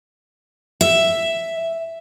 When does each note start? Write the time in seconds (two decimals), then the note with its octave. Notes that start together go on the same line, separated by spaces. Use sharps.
0.81 E5